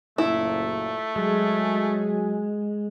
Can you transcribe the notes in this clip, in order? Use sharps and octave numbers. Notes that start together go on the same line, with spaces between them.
F#1 A#2 A3 E4
F#3 G#3 G#4